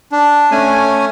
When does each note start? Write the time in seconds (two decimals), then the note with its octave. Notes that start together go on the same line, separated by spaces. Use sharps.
0.12 D4
0.52 A3 C#4 G#5